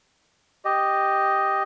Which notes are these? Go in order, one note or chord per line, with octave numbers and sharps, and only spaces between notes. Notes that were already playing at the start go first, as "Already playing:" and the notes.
G4 D#5